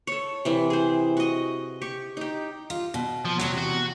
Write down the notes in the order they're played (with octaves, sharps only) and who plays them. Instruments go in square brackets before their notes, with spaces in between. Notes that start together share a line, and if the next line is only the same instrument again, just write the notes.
[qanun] A4 C#5
C3 E3
G#4 C5
F#4 D#5
G4 C#6
D#4 G4
[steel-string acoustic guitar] F4
B2
[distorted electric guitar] F3
[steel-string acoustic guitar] E2 A2 C3 [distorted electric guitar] F#3
[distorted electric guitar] F#4